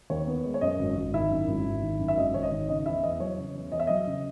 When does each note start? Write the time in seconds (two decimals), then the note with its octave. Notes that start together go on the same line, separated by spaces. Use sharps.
0.10 D#2 C#5
0.27 B3
0.44 G#3
0.54 C#5
0.61 F#2 D#5
0.79 G#1
0.96 G#1
1.14 D#3 E4 E5
1.31 F#2
1.48 G#1
1.65 G#1
1.83 D#3
2.00 F#2
2.08 E5
2.17 G#1 D#5
2.34 G#1 C#5
2.43 D#5
2.51 D#3
2.69 C#3 D#5
2.86 E2 E4 E5
3.03 E2 D#5
3.20 F#3 C#5
3.38 C#3
3.55 E2
3.72 E2 D#5
3.80 E5
3.87 F#3 D#5
4.07 C#3